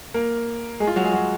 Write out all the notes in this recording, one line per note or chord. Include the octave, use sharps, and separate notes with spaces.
A#3 A#4
G#3 G#4
F4
F#3 F#4
G#3 G#4
F#3 F#4